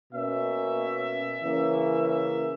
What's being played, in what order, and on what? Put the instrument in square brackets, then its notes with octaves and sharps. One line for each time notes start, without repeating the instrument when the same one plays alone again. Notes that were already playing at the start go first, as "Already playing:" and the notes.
[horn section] B2 A#3 C#4 E5
C#3 E3 A#3 C#4
E5